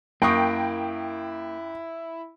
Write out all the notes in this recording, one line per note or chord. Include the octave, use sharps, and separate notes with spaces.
F#2 A#3 E4 G5 C#6 D#6